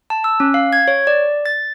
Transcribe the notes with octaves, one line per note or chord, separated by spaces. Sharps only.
A5
E6
C#4
F5
G#6
C#5
D5
A6